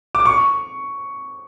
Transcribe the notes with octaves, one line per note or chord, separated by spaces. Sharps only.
D6
C#6